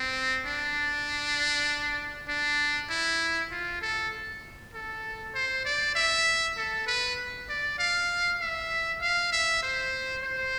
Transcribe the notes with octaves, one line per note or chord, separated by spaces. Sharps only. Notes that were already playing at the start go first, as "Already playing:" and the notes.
Already playing: C4
D4
D4
E4
F4
A4
A4
C5
D5
E5
A4
B4
D5
F5
E5
F5
E5
C5
C5